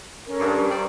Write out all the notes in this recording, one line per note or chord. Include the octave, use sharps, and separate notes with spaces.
C#4 A4 A#4
G2
G3 C5 D5 A#5